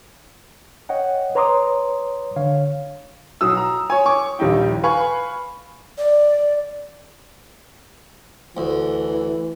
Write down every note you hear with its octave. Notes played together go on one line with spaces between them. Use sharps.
C#5 D#5 F#5 G5
B4 C#5 A#5 C6 D6 D#6
D3 C#5 F5
B1 F#3 D#6 E6
A#5
C#5 G#5
C#6 D6
A#1 D#2 G3 D#4 E4 G5
B4 F5 G#5 B5 C#6
D5
D2 E3